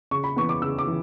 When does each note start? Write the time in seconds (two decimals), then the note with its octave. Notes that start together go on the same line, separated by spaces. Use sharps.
0.11 C#3 C#6
0.24 B5
0.36 E3 B3 C#6
0.49 D6
0.62 C#3 E6
0.79 D6
0.87 E3